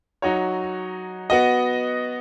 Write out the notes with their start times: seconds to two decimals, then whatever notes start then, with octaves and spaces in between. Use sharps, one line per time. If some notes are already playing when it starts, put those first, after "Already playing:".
0.22 F#3 D#4 F#4 C#5
1.30 B3 F#4 D#5